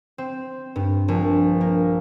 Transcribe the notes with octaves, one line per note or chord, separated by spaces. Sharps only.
C4
G2
A#1
A#3